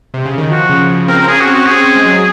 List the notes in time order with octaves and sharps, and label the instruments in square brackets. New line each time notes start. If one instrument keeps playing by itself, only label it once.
[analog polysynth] C3
C#3
D#3
[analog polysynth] F3 [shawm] F#4
[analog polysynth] C#3
C#3
[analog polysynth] C4 [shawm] A#4
[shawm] A#4
[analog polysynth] C#4 [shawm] G#4
[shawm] F#4
[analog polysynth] C4
[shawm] F#4
[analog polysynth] C#4 [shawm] G#4
[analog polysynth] C4
G#3
F#3